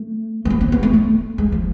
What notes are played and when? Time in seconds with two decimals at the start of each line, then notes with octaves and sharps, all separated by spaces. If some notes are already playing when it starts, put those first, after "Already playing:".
Already playing: A3
0.45 A3
0.50 B3
0.61 C4
0.72 B3
0.83 A3
0.93 A3
1.38 G#3
1.52 F3